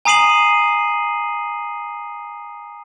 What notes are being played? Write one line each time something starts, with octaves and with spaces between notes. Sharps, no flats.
G#5 A#5 D#6 C7 D#7 F#7